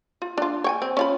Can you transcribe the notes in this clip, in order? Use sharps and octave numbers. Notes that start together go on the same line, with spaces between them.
F4
D4 F4
C#5 G5 G#5
C4
C#4 F4 B5